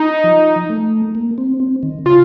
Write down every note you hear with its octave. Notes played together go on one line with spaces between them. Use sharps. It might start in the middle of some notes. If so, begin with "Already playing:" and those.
Already playing: D#4
F3
A3
A#3
C4
C4
D#3
C#3 F4